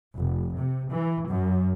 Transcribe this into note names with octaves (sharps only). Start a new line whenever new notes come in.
F1
C3
E3
F#2